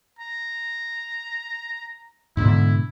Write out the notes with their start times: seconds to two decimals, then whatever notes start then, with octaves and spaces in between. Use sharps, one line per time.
0.19 A#5
2.37 G#2 B2 D3 E4